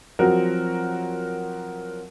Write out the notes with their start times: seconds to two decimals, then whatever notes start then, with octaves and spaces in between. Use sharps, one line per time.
0.19 F3 F#3 C4 F#4 A#4